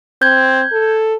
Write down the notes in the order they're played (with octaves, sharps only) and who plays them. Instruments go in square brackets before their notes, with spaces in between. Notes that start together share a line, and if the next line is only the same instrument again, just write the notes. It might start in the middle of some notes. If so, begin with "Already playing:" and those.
[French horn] C4 [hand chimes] G6 G#6
[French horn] A4